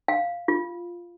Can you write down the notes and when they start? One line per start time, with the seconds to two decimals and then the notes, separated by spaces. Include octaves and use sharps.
0.08 F5
0.48 F4